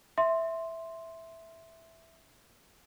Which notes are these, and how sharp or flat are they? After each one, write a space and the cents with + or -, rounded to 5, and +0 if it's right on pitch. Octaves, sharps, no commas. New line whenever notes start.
E5 +0 C6 +0